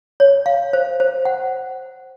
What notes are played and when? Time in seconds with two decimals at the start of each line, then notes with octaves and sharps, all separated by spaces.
0.20 C#5
0.46 F5
0.73 C5
1.00 C5
1.25 F#5